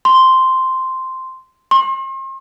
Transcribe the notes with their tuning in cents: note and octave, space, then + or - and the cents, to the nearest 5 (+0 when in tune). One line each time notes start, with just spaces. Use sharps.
C6 -5
C6 +40